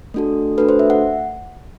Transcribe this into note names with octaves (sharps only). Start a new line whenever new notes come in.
A3 D4 F#4 A4
A3 D4 F#4 A4 B4
C5
E5
F#5